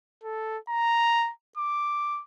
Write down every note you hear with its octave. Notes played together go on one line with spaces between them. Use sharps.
A4
A#5
D6